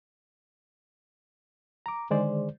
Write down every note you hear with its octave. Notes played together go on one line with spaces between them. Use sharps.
A#5 D6
D3 D#3 G#3 G#4 C5 D5